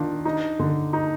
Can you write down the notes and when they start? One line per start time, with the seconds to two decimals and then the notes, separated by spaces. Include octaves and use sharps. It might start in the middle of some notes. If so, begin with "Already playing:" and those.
Already playing: D#3 D4 F4
0.25 D#4
0.59 D3
0.93 D#4